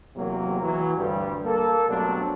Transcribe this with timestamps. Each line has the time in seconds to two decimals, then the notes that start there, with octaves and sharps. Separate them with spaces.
0.15 E2 C3 F#3 A#3
0.61 E3 F#3
0.97 D2 G2 G3
1.45 A#3 A4
1.87 G2 B2 F#3 A3 C4 D4